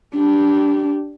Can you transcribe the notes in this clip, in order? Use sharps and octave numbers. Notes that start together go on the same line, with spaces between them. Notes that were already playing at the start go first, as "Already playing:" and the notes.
D4 G4